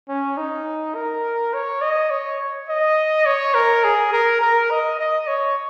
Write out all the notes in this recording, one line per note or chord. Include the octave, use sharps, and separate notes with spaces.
C#4
D#4
A#4
C#5
D#5
C#5
D#5
C#5
A#4
G#4
A#4
A#4
D#5
D#5
C#5